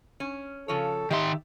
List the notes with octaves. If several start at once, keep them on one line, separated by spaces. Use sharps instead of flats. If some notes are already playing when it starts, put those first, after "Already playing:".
C#4
C#3 F3 A4 C#5
D#3 D#4 G4 E5 C6